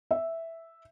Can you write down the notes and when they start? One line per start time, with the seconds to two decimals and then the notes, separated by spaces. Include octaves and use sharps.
0.11 E5